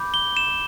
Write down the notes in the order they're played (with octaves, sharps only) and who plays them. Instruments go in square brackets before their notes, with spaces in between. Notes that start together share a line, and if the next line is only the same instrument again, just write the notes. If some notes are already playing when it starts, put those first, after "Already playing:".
Already playing: [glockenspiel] B5 D6 G6
G7
E7